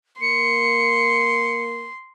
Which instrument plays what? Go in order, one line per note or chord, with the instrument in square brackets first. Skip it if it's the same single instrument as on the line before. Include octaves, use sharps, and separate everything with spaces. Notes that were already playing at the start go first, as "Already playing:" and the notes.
[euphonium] A#3 [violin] C6 [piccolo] C#7